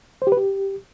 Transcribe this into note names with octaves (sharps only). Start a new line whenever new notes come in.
C5
G4
B4
G4